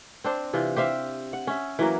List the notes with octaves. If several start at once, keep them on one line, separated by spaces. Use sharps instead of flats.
C4 D4 C5
C3 E3 F4
G4 C5 E5 F5
F#5
C#4 E5
E3 F#3 A#3